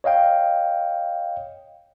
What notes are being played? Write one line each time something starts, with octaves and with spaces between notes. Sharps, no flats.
C#5 D#5 F5 G5